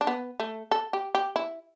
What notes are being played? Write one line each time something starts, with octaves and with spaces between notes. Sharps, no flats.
D4
B3
A3
A4
G4
G4
E4